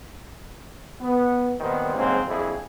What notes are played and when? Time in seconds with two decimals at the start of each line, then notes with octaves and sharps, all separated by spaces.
1.01 B3
1.60 A#2 D#3 G3 B3 C4
1.95 F2 G#2 C#3 F#3 A#3 C4
2.27 A#1 F2 G3 E4 G#4